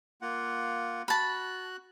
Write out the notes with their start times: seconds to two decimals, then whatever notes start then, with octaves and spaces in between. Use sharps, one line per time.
0.22 A#3 F4 F#5
1.08 F#4 A5 B5 F#6